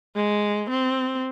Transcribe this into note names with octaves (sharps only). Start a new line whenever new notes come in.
G#3
C4